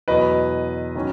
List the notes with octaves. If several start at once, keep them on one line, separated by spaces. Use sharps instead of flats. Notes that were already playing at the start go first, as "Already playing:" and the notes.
E2 B2 F#3 B4 D#5
D#3 F#3 C#4